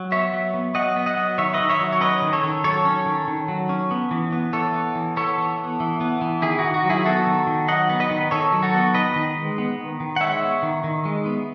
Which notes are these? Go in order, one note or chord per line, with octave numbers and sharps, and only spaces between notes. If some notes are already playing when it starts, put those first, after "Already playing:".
Already playing: F#3
B3 C#5 E5
F#3
B3
F#3 D#5 F#5
B3
D#5 F#5
F#3
D#3 C#5 E5
B4 D#5
D#3
C#5 E5
F#3
C#5
C#4 B4 D#5
D#3
A4 C#5
D#3
F#3 A4 C#5
C#4
D#3
D#3
F#3
C#4
B3
E3
B3
E3 A4 C#5
B3
E3
B3 A4 C#5
E3
B3
E3
B3
E3
D#3 E4 G#4
F#4
D#3
F#4
F#3
E4 G#4
B3 F#4 A4
D#3
D#3
F#3 D#5 F#5
B3
B4 D#5
D#3
D#3 A4 C#5
F#3
F#4 A4
B3
D#3 B4 D#5
D#3
G#3
B3
D#3
D#3
F#5
G#3 C#5 E5
B3
D#3
D#3
G#3
B3